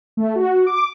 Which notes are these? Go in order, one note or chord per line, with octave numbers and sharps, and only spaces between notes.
A3
F#4
D6